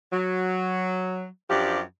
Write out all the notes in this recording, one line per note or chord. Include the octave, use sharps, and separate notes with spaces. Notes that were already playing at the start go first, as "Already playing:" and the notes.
F#3
F#2 F3 D4 G4